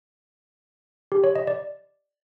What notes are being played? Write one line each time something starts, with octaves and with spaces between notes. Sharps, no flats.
G4
C#5
D#5
D5